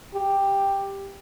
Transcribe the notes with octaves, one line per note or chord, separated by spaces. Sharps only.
G4